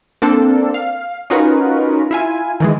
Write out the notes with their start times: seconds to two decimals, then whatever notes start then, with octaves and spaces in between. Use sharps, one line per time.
0.22 A#3 C4 D4 A4
0.74 F5
1.30 C#4 D#4 F4 F#4 A#4 B4
2.11 E4 F4 G#5
2.60 D#3 E3 G#3